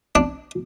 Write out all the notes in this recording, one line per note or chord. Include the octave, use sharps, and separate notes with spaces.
D4